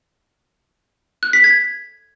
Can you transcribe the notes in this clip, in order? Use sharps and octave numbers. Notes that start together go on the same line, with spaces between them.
F#6
B6
G#6